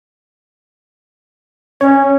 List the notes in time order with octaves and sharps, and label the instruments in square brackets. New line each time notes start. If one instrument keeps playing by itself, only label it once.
[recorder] C#4 [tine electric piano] C#5